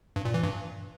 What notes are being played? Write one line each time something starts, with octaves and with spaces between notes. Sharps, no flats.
G2
A#2
E3
G2